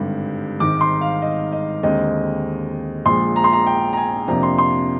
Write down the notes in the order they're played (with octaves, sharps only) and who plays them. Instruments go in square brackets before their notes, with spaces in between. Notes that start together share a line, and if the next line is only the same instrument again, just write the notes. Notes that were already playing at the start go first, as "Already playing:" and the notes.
Already playing: [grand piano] G#1 G2 D3 G3
G#1 G#2 D#3 D6
C6
F5
D#5
D#5
D#2 D3 G#3 C4 D#4 D#5
A#1 A#2 F3 G#3 C6
A#5
C6
A#5
G5
A#5
G#5
F2 C3 F3 A#3 D4 A#5
C6
C6